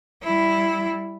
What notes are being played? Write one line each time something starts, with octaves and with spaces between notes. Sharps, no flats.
G3 E4